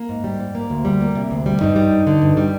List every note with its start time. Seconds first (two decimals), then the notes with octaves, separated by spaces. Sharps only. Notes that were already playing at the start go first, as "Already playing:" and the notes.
Already playing: A#3
0.09 G#2
0.24 G3
0.40 G#2
0.55 A#3
0.70 D2
0.85 G3
1.01 A#3
1.15 C3
1.31 D2
1.46 G3
1.61 G2 D#4
1.76 G3
1.91 G2
2.07 D3
2.22 G2
2.37 G3